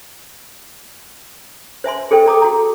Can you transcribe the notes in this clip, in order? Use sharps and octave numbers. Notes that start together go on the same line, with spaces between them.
C5 E5 G#5 C6
G#4 A4 C5 G5
A4 A#5 D6 D#6
F#4 A#5